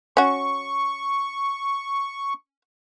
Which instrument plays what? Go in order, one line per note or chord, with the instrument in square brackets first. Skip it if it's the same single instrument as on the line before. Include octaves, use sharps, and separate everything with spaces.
[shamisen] C#4 F#4 [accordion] C#6